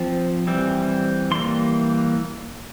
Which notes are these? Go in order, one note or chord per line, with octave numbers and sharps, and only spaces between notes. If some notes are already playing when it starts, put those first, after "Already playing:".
Already playing: F3 C4
E3 G3 C4
E3 G3 A#3 C6